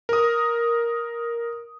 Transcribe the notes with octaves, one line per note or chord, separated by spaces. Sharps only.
A#4 D#6